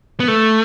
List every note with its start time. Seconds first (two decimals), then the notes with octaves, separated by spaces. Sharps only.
0.20 B3
0.28 A3